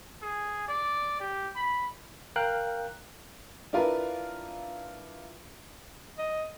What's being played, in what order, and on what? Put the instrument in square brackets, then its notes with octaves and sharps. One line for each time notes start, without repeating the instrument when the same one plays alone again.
[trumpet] G#4
D5
G4
B5
[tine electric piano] A#4 F5 G5 F#6
[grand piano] D4 E4 F4 A#4 B4
[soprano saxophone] D#5